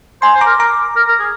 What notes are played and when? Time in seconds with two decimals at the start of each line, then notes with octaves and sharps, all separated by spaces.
0.22 C5 G#5 C6
0.35 C5
0.41 A#5 D6
0.46 A#4
0.59 A#4 A#5 D6
0.96 A#4
1.08 A#4
1.20 G#4